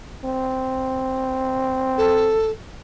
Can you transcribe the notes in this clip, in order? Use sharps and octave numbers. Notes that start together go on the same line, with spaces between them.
C4
A4